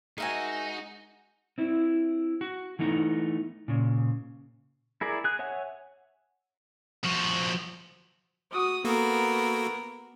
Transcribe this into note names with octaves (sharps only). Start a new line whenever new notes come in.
G#3 D#4 F#4 A#4 E5 F#5 G#5
C4 E4
F#4
E3 A3 B3 D#4
A#2 C#3
E4 G#4 A#4 D5
G#4 F#6
C#5 E5 F#5 G#5
F3 F#4
F#4 D#6
A#3 B3 F#4 A4 A#4